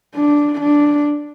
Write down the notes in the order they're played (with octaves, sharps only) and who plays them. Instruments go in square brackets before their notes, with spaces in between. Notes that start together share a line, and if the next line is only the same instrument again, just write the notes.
[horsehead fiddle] D4
D4